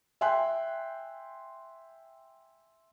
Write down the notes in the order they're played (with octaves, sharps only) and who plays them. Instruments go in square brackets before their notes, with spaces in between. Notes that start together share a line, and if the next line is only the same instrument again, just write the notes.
[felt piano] E5 G5 G#5 C6 F#6